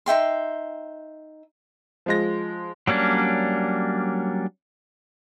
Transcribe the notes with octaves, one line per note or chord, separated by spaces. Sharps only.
D#4 E5 G5 C6
F3 G#3 A#6
F#3 G3 A#3 C#4 D4